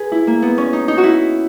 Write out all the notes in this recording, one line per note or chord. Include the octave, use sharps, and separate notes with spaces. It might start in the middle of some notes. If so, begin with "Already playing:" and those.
Already playing: G#4 B4
E4
A#3
B3
C#4
D#4
D#4
F#4
E4